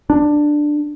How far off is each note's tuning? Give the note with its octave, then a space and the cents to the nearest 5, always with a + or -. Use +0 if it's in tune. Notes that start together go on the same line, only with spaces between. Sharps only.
D4 +10